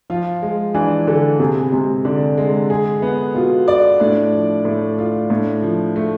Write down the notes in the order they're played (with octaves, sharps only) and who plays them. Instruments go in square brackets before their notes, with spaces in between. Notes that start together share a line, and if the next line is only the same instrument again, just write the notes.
[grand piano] F3 [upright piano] F4
[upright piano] G#3
[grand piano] E3 [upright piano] D4
[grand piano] D3 [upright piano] A4
[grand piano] C3 [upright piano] G#4
[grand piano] C3 [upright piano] G#3
[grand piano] D3 [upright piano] D4
[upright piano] G#3
G#4
B3
[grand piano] B2 [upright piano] F4
[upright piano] D5
[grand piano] A2 [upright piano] D4
[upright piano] F3
[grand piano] A2 [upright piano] A3
[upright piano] F4
[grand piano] A2 [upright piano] D4
[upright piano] F3
A3